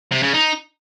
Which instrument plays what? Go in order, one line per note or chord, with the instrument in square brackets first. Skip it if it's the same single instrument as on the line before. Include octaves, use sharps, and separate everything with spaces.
[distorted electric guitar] C3
C#3
D#4